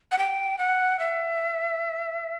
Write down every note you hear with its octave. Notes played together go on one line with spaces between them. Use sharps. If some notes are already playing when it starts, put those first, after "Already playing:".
F#5
G5
F#5
E5